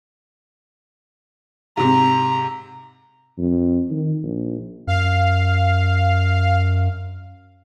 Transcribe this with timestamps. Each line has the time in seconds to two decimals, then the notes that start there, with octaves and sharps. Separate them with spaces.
1.77 G#2 C3 A#5
3.38 F2
3.90 D#3
4.23 A#1
4.87 F#2 F5